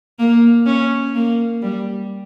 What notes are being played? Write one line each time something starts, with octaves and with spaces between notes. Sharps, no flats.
A#3
C#4
A#3
G3